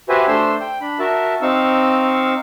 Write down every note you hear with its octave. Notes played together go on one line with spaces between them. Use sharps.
F#4 G4 B4 C5 E5 G#5
A3 D4 C5 C6 E6
G5
D4 B5
F#4 A#4 E5 A5
C4 D#4 F5 C#6 E6